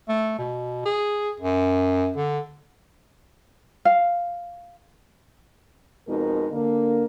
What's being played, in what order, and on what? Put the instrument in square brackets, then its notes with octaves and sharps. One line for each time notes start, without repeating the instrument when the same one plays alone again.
[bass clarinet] A3
B2
G#4
F#2
D3
[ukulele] F5
[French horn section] F2 B2 G#3 D#4 A#4
D3 A#3